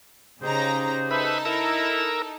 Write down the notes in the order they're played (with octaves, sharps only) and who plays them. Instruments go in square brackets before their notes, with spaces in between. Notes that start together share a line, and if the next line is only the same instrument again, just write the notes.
[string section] C#3 D#4 A#5 [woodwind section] G4 G#4 C5
[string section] D#4 A4 [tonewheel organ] B4 E5 B5
[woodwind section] E4 [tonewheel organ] A#4 A#5 E6